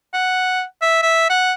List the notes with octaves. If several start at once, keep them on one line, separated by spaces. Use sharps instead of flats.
F#5
E5
E5
F#5